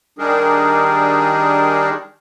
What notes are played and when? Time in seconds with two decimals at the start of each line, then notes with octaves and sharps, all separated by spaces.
0.19 D#3 G3 D4 D#4 G#4 A#4